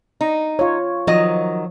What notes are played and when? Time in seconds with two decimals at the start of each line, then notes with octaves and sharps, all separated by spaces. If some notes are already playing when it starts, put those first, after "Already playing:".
0.21 D#4
0.59 F4 C#5
1.07 D#3 F3 F#3 D#5